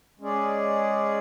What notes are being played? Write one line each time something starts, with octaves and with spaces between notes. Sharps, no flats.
G#3 C#4 G#4 D5